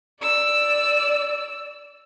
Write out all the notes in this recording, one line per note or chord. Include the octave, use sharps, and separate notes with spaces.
D5 E6